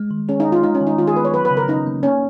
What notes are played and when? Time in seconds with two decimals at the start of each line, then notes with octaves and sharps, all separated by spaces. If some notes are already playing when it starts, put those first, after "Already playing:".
Already playing: G#3
0.11 D#3
0.29 C#4 G#4
0.40 D#4
0.46 C#4
0.52 F4
0.63 G#3 D#4
0.75 C#4
0.81 D#3
0.87 D#4
0.98 D#3 F4
1.07 G#4
1.16 B3 B4
1.25 C#5
1.34 F#3 B4
1.45 B4
1.50 C#3
1.57 A#4
1.68 C#4 D#4
1.87 A#3
2.03 A#3 C#4